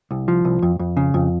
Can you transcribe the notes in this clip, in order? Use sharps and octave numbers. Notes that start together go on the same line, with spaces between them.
C2
F3
C2
F2
F2
C#3
F2